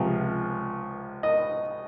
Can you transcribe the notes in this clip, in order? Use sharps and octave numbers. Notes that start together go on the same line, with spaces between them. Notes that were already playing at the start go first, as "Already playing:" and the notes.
Already playing: C#2 C3 F3
D#5